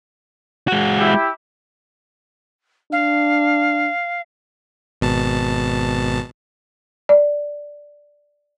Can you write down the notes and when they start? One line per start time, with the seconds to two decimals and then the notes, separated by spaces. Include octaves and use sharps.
0.68 G#3 F#4
0.97 E4 G4
2.92 D4 F5
5.01 G#1 B2 A5
7.09 D5